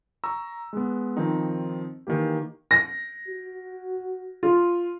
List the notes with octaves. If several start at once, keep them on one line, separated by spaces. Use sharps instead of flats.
A#5 C#6 E6
G#3 B3
D#3 F3 C4 D#4
D#3 E3 A#3 G4
A#6
F#4
F4